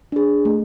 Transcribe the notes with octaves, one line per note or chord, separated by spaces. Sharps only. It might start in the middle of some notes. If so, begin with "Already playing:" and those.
D4 G#4
A3